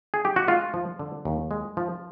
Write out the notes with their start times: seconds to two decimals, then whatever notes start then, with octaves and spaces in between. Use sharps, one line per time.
0.14 G#4
0.25 G4
0.36 F#4
0.47 G#3 F4
0.74 F3
0.99 D3
1.25 D#2
1.51 G#3
1.77 F3